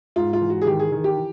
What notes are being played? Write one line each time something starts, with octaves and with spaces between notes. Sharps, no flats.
G#2 F4
F4
E3
F#4
G#4
D#3 G4
G#4
D#3 G#4
G4
E3